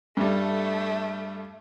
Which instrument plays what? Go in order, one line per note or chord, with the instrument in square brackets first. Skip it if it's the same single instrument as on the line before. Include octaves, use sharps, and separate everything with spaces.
[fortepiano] G2 G3 [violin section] A3 A4